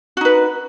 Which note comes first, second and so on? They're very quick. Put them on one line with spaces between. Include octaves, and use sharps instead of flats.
F#4 D#4 B4